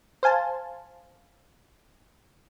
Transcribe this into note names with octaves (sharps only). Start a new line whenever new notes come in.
C5 F5 G#5 A5